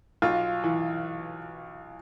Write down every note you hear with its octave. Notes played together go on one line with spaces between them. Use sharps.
B1 F4
E3